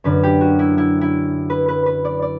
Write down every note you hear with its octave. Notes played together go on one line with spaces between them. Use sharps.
F#2 D3 B4
G4
F#4
E4
E4
E4
B4
B4
B4
D5
D5